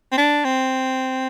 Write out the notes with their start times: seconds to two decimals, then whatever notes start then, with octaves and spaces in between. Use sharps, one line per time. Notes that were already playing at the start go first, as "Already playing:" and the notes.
0.12 C4
0.18 D4
0.44 C4